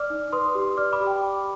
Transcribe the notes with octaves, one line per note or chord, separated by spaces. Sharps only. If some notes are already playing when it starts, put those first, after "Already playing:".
Already playing: D5 D6 F6
D#4
B4 C6 D#6
G4
D5 D6 F6
B5 D6
G4
G5